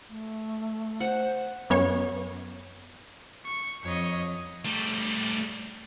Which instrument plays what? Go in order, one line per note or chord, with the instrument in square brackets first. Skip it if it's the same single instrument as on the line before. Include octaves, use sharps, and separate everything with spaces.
[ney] A3
[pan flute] C5 [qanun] F#5
[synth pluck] F#2 B3 C#5
[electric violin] C#6
[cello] F2 [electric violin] C#5 D#5
[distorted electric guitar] G3 A3